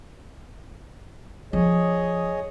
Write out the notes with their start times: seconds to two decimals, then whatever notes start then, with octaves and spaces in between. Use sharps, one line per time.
1.53 F3 G#4 C#5 D#5